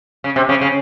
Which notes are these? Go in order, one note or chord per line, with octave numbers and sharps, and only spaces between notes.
C#3
C3
C#3
C#3